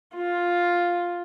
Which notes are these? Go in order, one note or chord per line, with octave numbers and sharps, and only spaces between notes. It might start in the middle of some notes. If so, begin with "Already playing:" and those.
F4